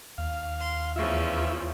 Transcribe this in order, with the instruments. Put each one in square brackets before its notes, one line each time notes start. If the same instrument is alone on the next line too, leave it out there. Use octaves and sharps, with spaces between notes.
[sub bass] D#2 [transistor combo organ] F5
[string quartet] C6
[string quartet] E2 C#3 F3 [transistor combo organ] F4 E5